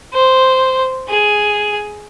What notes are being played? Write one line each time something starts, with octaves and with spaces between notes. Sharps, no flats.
C5
G#4